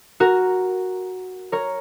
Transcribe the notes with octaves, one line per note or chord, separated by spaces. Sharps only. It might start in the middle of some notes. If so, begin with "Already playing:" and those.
F#4 A#4
A#4 C#5